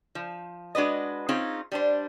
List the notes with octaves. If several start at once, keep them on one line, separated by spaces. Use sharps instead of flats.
F3
G#3 D4 F#4 B4 D#5
C4 C#4 D#4 F4 G#4
G3 D4 C5